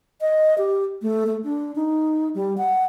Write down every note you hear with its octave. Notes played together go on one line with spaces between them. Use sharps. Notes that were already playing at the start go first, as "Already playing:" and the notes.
D#5
G4
A3
A3
D4
D#4
G3
F#5